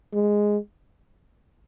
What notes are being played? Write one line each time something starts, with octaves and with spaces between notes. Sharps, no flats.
G#3